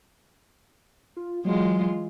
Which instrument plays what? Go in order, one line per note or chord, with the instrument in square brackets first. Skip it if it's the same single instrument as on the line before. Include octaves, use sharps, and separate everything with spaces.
[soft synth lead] F4
[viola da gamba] E3 G#3 F4 [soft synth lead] F#3